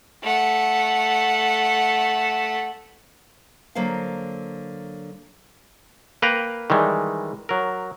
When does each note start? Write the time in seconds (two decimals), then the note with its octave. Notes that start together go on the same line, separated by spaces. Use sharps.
0.22 A3 F#5
3.75 D3 F#3 A#3 C5 F5
6.22 A#3 B4 F5 G5 A#5
6.70 D#3 E3 G3 G#3
7.49 F#3 A#4